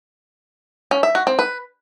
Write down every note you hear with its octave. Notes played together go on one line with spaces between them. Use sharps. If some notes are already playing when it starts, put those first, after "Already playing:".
C#4
E5
F#4
C4
B4